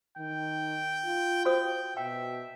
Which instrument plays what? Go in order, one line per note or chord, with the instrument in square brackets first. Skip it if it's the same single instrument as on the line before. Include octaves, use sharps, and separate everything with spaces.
[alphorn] D#3 [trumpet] G5
[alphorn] F4
[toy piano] F#4 C5 D#6 [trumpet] G5
[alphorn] B2 [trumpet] E5 [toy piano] G5